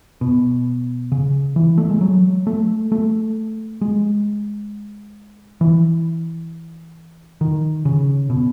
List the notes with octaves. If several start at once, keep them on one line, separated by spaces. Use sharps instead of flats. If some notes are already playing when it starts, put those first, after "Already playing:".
B2
C#3
E3
A3
G#3
F#3
A3
A3
G#3
E3
D#3
C#3
B2